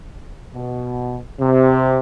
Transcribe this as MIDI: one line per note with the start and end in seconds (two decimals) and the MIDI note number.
0.55 1.17 47
1.40 1.99 48